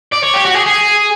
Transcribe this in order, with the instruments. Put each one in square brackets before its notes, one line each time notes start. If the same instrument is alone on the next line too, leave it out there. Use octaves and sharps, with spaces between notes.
[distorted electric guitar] D5
C#5
G4
F#4
G#4
G#4